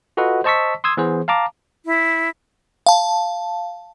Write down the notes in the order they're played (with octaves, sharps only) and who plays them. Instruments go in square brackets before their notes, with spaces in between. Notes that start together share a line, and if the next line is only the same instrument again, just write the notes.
[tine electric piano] F4 F#4 A4 B4 D#5 F#5
C5 D#5 A5 C#6 E6 B6
C6 D#6 E6 G#6
E3 B3 G#4 C5
F5 A5 A#5 D6
[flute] E4
[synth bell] F5 A5